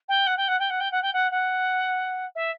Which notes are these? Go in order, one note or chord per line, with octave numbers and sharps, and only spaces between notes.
G5
F#5
G5
F#5
G5
F#5
G5
F#5
G5
F#5
F#5
E5